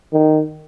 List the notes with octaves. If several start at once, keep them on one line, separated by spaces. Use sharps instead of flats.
D#3